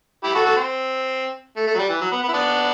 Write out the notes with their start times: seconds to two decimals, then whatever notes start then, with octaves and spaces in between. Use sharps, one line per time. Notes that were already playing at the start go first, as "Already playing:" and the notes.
0.24 E4 G4
0.34 F#4 A4
0.45 F#4 A4
0.57 C4
1.56 A3
1.67 A3
1.74 F#3
1.78 G3
1.89 E3
2.01 F#3
2.12 B3
2.23 B3
2.29 E4
2.33 B3 D4